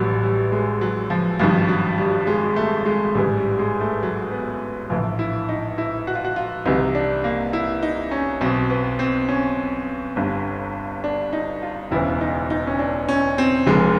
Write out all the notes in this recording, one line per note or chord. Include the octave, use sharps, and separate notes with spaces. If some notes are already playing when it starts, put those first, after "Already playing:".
Already playing: A1 A2 E3 F#3 G3
G3
G#3
F#3
F3
G#1 G2 D#3 F3
F#3
G3
G#3
A3
G#3
A1 G#2 E3 G3
G3
G#3
A3
F#3
B3
A#1 A2 E3 F4
E4
D#4
E4
F#4
F4
F#4
F4
C2 C3 E3 D#4
D4
A#3
E4
D#4
C#4
B1 B2 C4
B3
C4
C#4
G1 G2 D3
D4
D#4
F4
E1 D2 C#3 E3 E4
D#4
D#4
C#4
D4
C#4
C4
F1 F2 D3 G#3